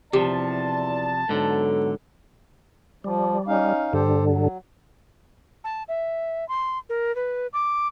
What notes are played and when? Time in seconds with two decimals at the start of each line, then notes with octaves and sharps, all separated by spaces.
0.13 E2 C3 F3 E4 G4 D5 A5
1.29 G#2 D3 F#3 B3 A4
3.04 F3 G3
3.48 C#4 D#4 F5
3.93 G2 D3 G4 A4 C5
4.26 F#3
5.64 A5
5.88 E5
6.49 C6
6.89 A#4
7.16 B4
7.53 D6